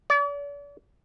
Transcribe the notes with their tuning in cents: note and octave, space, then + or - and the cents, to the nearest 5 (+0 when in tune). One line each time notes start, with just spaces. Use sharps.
D5 -40